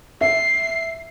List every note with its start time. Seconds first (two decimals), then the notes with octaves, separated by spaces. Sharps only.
0.21 E5 C7